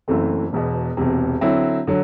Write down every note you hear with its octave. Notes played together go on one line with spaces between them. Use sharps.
F#1 F#2 E3 A3 C4
E1 E2 B2
E1 E2 C3
D3 F#3 C4 E4
D3 F#3